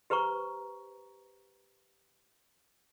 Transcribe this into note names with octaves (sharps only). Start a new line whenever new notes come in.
G4 B4 C5 A#5 C#6